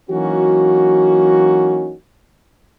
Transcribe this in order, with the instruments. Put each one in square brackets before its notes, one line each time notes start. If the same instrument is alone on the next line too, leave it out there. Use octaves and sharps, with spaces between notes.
[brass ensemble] E3 F#3 A#3 C#4 D#4 F#4